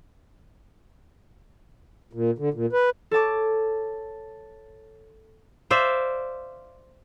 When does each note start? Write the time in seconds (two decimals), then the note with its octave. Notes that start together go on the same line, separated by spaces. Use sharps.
2.13 A#2
2.38 D3
2.54 A#2
2.73 B4
3.11 A4 C#5 A5 D6
5.71 C5 D5 E5 F5